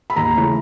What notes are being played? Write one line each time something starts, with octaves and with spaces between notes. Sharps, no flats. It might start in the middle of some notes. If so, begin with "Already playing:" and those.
B5
D#2 A#5
C#3 E3 A3